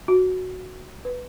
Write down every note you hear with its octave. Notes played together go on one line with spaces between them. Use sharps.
F#4
B4